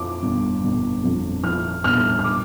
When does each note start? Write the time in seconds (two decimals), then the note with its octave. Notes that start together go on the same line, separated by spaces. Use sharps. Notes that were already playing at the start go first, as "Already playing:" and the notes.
Already playing: F2 F3 D6
0.23 G1
0.64 G1
1.04 F2
1.43 F3 F6
1.84 G1 F6
2.19 F6
2.24 D6